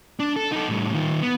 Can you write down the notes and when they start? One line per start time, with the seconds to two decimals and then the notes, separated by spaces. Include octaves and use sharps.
0.20 D4
0.36 A4
0.52 D#4 A4
0.69 A2 G3
0.93 D#3 F4
1.22 B3